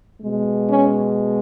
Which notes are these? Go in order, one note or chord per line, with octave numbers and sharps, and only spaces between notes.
B2 G#3
C#4